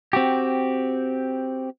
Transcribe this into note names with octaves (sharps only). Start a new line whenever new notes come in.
C4 F#4 G4